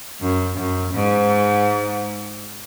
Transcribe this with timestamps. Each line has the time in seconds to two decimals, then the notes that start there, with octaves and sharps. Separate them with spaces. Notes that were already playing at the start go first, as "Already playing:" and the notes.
0.21 F#2
0.57 F#2
0.94 G#2